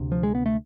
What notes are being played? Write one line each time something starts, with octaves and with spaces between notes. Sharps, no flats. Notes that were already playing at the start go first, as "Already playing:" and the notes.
Already playing: D2 C3
F3
G#3
B3
A3